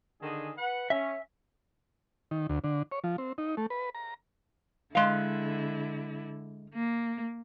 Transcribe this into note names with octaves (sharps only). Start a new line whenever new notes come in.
D3 D#3 G#4
B4 F#5
C#4 E5
D#3
D2
D3
C#5
F3
C4
D#4
A3
B4
A#5
D3 G#3 E4 F5
A#3